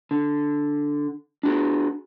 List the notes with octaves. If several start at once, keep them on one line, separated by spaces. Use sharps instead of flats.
D3
D4 F#4 G#4